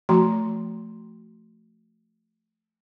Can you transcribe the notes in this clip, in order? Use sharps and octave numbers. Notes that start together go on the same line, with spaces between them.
F3 A3 F#4 A#5 C6